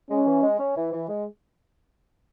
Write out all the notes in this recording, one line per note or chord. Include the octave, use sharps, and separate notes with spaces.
G#3 C#4
E3
G#3
C#4
E3
E3
G#3